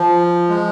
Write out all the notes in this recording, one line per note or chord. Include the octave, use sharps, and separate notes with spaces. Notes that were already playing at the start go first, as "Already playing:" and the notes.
Already playing: F3
G#3